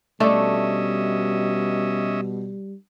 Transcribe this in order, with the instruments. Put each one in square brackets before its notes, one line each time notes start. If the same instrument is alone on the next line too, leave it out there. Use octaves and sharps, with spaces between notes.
[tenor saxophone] B2 [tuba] G3 [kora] A3 D4 A4 [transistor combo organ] C#4 D#5 E5